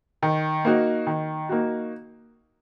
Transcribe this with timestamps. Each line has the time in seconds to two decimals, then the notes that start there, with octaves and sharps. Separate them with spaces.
0.23 D#3
0.65 A#3 D#4 F#4
1.07 D#3
1.49 A#3 D#4 F#4